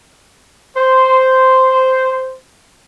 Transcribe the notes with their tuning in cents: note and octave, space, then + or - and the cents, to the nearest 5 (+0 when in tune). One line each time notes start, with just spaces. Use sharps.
C5 -5